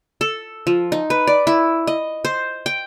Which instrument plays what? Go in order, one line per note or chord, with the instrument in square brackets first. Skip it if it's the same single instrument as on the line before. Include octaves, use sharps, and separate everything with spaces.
[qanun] A4
F3
D#4
B4
D5
E4
D#5
C5
G5